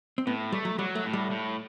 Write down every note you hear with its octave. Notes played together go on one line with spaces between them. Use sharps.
C4
A2 B3
G3 A3
F#3
F#3 G3
A3
A2
G3
A2